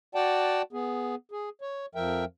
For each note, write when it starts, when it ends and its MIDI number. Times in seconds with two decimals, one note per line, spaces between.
0.15 0.62 66
0.15 0.62 74
0.15 0.62 78
0.15 0.62 79
0.15 0.62 81
0.73 1.15 59
0.73 1.15 68
1.31 1.49 68
1.61 1.86 73
1.95 2.25 41
1.95 2.25 53
1.95 2.25 70
1.95 2.25 76
1.95 2.25 79